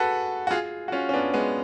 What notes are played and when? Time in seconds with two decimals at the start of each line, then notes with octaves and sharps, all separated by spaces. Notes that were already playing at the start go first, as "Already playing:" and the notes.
Already playing: F#4 G#4 A4 B4
0.47 F#4
0.51 F4 G#4
0.88 F#4
0.92 C#4 F4
1.09 C#4
1.13 B3 D4
1.34 G#3 B3